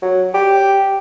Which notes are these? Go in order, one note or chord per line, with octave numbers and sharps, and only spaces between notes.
F#3
G4